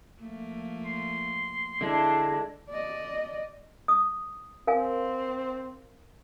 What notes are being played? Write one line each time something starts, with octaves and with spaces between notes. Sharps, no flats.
F3 A3 A#3
C6
D3 G#3 D4 E4
D5 D#5
D#6
C4 A#4 F5 G#5